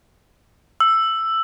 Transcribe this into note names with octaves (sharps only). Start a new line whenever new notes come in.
E6